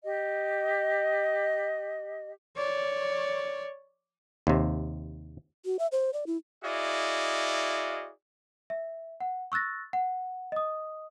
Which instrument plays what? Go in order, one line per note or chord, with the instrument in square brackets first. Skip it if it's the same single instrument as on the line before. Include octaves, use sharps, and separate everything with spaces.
[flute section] G4 D#5
[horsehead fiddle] C#5 D5
[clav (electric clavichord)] D#2 C3
[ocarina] F#4
E5
C5
D5
E4
[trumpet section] E4 F#4 G#4 D5 D#5 F5
[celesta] E5
F#5
C#6 E6 F#6 A6 A#6
F#5
D#5 D#6